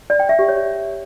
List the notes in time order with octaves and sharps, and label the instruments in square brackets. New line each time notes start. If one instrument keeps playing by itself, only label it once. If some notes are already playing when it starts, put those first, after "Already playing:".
[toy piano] D5
G5
E5
G4
C#5